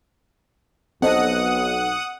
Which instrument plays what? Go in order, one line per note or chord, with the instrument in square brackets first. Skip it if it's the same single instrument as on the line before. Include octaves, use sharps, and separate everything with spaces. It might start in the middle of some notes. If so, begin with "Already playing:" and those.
[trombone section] B1 [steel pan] C4 A4 D#5 [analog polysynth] F#5 D#6